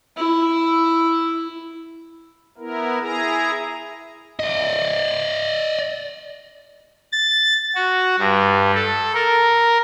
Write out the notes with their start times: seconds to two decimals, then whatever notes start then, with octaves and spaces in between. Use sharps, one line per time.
0.17 E4
2.58 B3 E4 A#4
3.01 E4 G#4 A#5
4.40 D5 D#5
7.13 A6
7.75 F#4
8.19 G2
8.74 A4
9.14 A#4